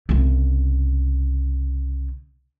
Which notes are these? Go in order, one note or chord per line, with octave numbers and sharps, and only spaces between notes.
C2 C#3